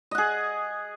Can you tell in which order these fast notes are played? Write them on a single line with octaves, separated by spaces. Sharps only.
D#5 F#5 G#4